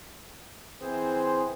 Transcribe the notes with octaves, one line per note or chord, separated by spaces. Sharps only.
E3 C4 G#4 C5